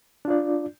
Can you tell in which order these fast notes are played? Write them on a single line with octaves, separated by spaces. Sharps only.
D4 F4 D5